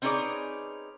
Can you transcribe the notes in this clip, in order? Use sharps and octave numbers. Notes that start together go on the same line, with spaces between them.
C4 C#4 D#4 G#4 B4 D5